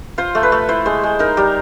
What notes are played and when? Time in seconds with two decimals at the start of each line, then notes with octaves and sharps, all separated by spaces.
0.18 F4 C5
0.35 A3
0.43 B4
0.52 A3
0.69 E4 C5
0.86 G#3 C5
1.03 G#3
1.19 D#4 A#4
1.37 G3 A#4